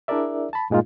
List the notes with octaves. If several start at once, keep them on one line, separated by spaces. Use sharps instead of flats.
D4 E4 G#4 A#4 D5 E5
A5 B5
G2 A#2 G#3 D#4 F4